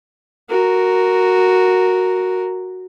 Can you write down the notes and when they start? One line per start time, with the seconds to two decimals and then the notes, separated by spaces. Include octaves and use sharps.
0.50 F#4 A#4